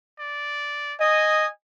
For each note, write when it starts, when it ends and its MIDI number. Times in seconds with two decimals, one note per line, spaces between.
0.19 0.94 74
1.00 1.46 75
1.00 1.51 80
1.00 1.47 87